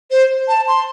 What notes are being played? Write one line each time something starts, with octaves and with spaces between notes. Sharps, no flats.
C5
A5
C6